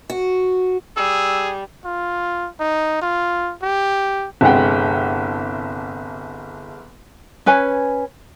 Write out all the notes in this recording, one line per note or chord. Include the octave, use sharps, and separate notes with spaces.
F#4
G3 G#4 E6
F4
D#4
F4
G4
G1 C2 G#3 F#5 G5
C#4 B4 G#5